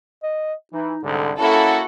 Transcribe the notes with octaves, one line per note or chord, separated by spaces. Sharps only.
D#5
E3 D#4
C2 G#2 D3 A4
A#3 C#4 E4 F#4 A4 A5